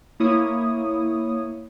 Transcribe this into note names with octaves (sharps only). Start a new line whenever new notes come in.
A#3 E4 C#5 D#6